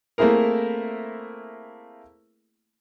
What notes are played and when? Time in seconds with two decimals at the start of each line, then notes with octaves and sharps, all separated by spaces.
0.18 A3 A#3 C4 E4 G#4 A#4